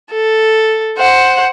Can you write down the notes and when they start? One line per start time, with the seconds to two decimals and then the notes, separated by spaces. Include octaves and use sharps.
0.12 A4
0.98 C5 F#5